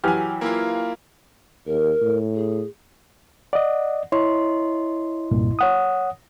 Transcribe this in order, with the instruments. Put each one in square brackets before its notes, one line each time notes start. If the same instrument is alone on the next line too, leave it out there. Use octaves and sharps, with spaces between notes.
[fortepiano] E3 F#3 G4 [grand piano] G#5 F6
[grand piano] A#3 E4 F4
[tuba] D#2 [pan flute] A#4
[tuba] A2
[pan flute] G#4
[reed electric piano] D5 D#5 [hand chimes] F#5
[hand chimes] E4 D#5 C6 [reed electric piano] C#5
[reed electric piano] C2 G2 A#2
C#5 F#5 D#6